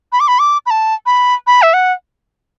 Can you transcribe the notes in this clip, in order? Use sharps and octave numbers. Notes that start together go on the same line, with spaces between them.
B5
D6
B5
D6
B5
A5
B5
B5
E5
F#5